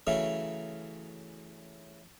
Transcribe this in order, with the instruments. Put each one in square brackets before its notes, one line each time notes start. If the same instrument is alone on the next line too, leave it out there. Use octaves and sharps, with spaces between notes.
[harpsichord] C#3 E3 F#3 A3 C#4